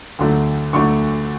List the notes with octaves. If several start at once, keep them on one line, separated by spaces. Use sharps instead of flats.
D2 D3 F#3 A3
D2 D3 F#3 A3 C#6